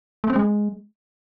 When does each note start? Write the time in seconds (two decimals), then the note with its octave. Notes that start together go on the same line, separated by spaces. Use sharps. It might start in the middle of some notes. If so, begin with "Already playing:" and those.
0.24 A3
0.30 C4
0.36 G#3